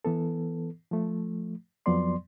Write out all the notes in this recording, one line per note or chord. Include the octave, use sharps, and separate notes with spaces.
E3 B3 A4
F3 A3
F2 F3 F#3 B3 D5 C6